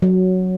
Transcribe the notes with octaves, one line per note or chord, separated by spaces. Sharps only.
F#3